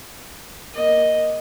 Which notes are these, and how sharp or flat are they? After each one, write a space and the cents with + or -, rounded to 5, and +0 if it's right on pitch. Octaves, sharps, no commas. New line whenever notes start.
A#3 +15 D#5 +0